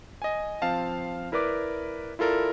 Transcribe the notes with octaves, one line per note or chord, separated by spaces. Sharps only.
D#5 G#5
F3 C4 F5 A5
E4 A#4 B4 D5 D6
E4 F4 A4 A#4 D5